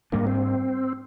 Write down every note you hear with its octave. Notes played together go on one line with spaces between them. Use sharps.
G#2 G3 A#3 D4
C4